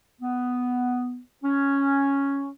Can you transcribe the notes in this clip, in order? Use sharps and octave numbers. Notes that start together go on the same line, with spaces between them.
B3
C#4